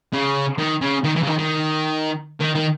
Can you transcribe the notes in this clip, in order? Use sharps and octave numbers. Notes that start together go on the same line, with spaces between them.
C#3
D#3
C#3
D#3
E3
C#3
D#3
D#3
D#3
D#3